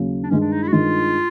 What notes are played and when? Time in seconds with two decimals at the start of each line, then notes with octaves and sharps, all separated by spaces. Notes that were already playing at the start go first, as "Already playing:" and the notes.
Already playing: D#2 C#3 F#3
0.23 D4
0.30 G2 D#3 G#3 C#4
0.41 D4
0.52 D#4
0.62 E4
0.68 F#4
0.72 G2 D#3 G#3 F4